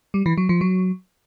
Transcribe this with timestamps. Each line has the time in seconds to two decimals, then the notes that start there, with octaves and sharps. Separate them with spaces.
0.14 G3
0.26 E3
0.37 F#3
0.49 F3
0.61 F#3